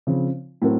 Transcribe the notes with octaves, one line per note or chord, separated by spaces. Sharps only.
C#3 F3 C4
A2 F#3 C4 F#4 A#4